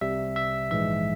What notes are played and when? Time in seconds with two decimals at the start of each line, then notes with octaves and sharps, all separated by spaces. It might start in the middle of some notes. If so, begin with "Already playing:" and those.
0.01 C2 C3 G3 E5
0.36 E5
0.71 A#1 G#2 E3 G#3 E5